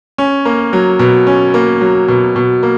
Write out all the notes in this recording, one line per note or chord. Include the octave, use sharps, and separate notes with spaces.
C#4
A#3
F#3
B2
C#4
A#3
F#3
B2
B2
A#3